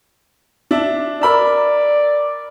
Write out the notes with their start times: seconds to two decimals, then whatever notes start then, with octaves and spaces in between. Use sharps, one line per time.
0.71 D4 E5
1.22 A#4 D5 B5 E6